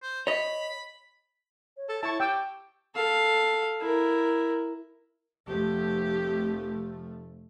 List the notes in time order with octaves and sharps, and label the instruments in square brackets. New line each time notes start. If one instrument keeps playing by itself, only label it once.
[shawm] C5
[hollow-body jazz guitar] C#5 D#5 [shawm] B5
[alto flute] C#5
[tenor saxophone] A4
[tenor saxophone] E4 [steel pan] A5 C#6
[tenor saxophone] G4 [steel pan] G5 E6
[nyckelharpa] A4 F5
E4 A#4
[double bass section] F1 F3 A3 [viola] G4